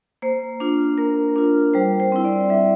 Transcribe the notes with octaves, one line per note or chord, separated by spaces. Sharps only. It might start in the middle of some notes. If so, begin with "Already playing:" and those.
A#3 C5
D4 F4
A#3 A#4
D4 F4
G3 C5
C5
C4 E4
D5
G3 E5